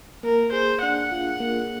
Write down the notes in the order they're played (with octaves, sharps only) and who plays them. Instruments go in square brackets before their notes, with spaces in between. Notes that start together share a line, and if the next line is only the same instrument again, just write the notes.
[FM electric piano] A#3 [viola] A#4
[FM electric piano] G#4 [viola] C5
[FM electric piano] D4 [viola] F#5
[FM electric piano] F4
A#3